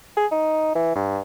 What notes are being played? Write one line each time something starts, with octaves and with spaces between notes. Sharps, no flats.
G#4
D#4
E3
G2